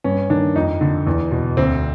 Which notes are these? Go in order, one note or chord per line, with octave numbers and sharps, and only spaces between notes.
G2 C#4
D#3 D4
F2 D#4
D3
E2
B2
D2 C4